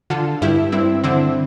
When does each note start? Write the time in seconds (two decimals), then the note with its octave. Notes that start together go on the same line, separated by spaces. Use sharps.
0.10 D3 F4 A4
0.42 G2 E4 G4
0.72 G2 C4 E4
1.04 D3 C4 E4